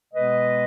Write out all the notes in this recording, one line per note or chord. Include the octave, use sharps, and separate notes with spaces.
B2 G#3 B3 B4 D#5